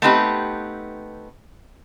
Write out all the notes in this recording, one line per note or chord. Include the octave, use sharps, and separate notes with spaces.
A3 B3 C4 D#4 G4 B4